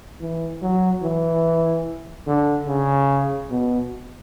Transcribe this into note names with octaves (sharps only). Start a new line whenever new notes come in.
E3
F#3
E3
D3
C#3
B2